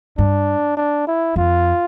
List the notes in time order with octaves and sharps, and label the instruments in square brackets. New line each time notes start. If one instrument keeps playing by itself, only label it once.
[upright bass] G2 [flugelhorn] D4
[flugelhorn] D4
E4
[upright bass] F2 [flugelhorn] F4